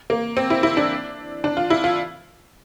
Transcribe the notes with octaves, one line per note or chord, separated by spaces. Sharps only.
A#3
C4
E4
E4
D4
D4
F4
E4
F4